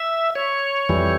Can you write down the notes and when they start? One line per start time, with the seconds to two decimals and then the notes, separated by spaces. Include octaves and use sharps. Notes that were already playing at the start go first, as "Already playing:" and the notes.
Already playing: E5
0.35 C#5
0.89 F2 E3 G3